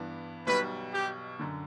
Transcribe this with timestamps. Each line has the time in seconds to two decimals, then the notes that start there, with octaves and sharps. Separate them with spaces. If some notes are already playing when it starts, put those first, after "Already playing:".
Already playing: G2 E3 B3 D4
0.47 B1 B2 G3 B4
0.93 G4
1.39 F#2 D3